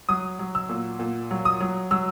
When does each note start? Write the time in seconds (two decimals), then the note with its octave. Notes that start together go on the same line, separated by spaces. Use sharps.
0.09 F#3 D#6
0.39 F#3
0.55 E6
0.69 A#2
0.99 A#2
1.31 F#3
1.45 D#6
1.61 F#3
1.91 F#3 E6